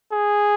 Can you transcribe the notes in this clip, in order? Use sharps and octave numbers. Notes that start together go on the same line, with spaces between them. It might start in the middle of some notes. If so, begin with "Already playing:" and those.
G#4